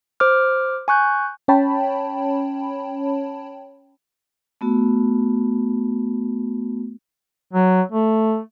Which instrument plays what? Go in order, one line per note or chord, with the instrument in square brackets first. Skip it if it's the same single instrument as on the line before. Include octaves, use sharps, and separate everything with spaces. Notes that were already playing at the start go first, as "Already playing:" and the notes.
[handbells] C5 D6 F6
G#5 C#6 F#6 G6
[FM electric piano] C#4 C#5 G5 A5 B5
[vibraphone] A3 B3 F#4
[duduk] F#3
A3